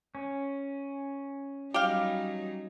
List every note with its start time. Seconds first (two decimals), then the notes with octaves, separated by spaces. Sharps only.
0.15 C#4
1.74 F#3 G3 D#4 G4 F5